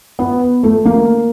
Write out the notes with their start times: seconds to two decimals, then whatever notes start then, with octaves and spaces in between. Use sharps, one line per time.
0.19 B3
0.63 A3
0.85 A#3